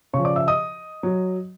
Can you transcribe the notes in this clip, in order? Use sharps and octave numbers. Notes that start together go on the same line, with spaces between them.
C#3 F3 C#5 C#6
D5 D6
E5 E6
D#5 D#6
F#3